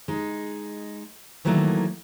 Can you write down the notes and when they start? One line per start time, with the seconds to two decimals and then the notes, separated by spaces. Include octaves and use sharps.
0.08 G#3 D#4
1.45 D#3 E3 F#3 A3 A#3